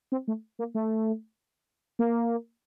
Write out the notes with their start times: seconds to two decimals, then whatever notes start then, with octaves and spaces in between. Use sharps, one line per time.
0.12 C4
0.28 A3
0.59 A#3
0.75 A3
1.99 A#3